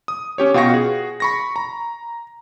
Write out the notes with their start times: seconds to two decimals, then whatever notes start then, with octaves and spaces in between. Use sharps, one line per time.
0.08 D#6
0.38 C#4 G4 C#5
0.54 B2 F4 F5 G5 C#6 A#6
0.70 F#4 G#4
1.20 B5 C#6 A#6
1.56 A#5